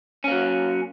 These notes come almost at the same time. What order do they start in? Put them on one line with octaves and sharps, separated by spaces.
C#4 A#3 F#3